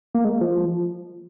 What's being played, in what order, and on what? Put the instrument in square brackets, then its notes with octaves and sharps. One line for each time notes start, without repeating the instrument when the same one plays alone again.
[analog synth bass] A#3
G#3
F3